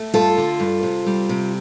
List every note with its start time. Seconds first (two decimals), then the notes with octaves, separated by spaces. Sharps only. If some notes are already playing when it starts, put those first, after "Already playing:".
Already playing: A3
0.14 G2 F4 A4
0.38 D3
0.60 G2
0.83 C3
1.06 G3
1.29 C3